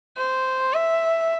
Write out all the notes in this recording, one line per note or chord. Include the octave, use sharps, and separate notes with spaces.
C5
E5